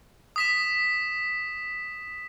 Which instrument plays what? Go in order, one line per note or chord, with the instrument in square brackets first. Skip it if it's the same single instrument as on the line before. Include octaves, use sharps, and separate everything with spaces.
[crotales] D#6 B6 E7